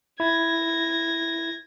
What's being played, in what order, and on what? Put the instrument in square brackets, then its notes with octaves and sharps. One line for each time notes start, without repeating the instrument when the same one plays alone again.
[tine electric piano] E4 [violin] G#6 A#6